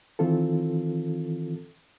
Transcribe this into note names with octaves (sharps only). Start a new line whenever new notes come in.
D#3 E3 C4 F4 A4